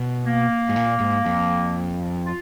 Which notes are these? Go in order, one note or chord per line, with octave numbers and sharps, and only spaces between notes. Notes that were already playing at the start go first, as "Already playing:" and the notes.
Already playing: B2
A#3
G#2
A#2
G#2
F2
F4